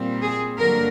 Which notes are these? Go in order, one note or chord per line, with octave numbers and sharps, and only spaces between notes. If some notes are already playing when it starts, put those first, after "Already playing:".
Already playing: A#2 G3 C4
G#4
G2 D3 F#3 A#3 A#4